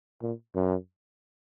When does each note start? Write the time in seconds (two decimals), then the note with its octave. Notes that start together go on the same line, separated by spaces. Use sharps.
0.23 A#2
0.55 F#2